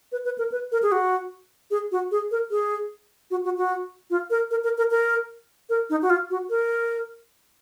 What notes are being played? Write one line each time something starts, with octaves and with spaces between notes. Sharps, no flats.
B4
B4
A#4
B4
A#4
G#4
F#4
G#4
F#4
G#4
A#4
G#4
F#4
F#4
F#4
F4
A#4
A#4
A#4
A#4
A#4
A#4
D#4
F#4
F4
F#4
A#4